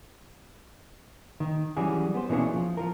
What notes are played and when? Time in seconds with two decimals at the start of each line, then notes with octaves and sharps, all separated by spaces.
1.40 D#3
1.77 E3 F#3 G3 C#4 F#4 G#4
2.14 B3 C5
2.29 B2 E3 A#3 C#4 D4 G#4
2.54 F3
2.77 F3 F4 A#4